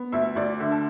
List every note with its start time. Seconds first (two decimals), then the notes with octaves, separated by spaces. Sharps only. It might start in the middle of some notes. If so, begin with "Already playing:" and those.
Already playing: B3
0.12 D2 E5
0.36 D2 D5
0.60 D3 E5
0.72 A5